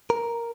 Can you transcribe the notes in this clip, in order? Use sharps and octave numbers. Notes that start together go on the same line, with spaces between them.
A#4